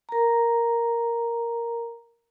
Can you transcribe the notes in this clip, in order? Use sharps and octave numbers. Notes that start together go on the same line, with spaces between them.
A#4 A#5